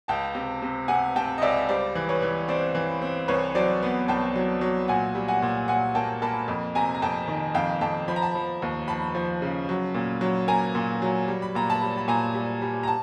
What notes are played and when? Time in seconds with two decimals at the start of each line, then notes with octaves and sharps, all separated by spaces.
0.08 C#2 G5 A5
0.35 C3
0.62 C3
0.88 C3 F#5 G#5
1.16 C3 G5 A5
1.38 D#5
1.42 C#2 D5 E5
1.69 G3 C5 D5
1.95 E3
2.09 B4 C#5
2.22 E3
2.48 C4 C5 D5
2.75 E3
3.02 C4
3.28 C2 B4 C#5
3.55 F#3 C5 D5
3.83 B3
4.08 C2 G5 A5
4.36 F#3
4.61 F#3
4.88 A#2 F#5 G#5
5.15 G3
5.28 F#5 G#5
5.42 A#2
5.68 A#2 F#5 G#5
5.95 A#3 G5 A5
6.22 A#3 A5 B5
6.48 F2
6.75 C3 G#5 A#5
6.95 A#5
7.02 F2 G5 A5
7.28 D#3
7.54 F2 F5 G5
7.81 F2 G5 A5
8.08 F3 B5
8.16 A#5
8.22 A5 B5
8.35 F3
8.62 D#2
8.88 F3 A5 B5
9.15 F3
9.42 C#3
9.69 F#3
9.94 A#2
10.21 F#3
10.48 A#3 G#5 A#5
10.75 A#2
11.02 F#3
11.28 G3
11.42 B5
11.55 A#2 A#5
11.70 A5 B5
11.82 G3
11.98 B5
12.08 A#2 G#5 A#5
12.34 G3
12.62 G3
12.83 A#5
12.88 A5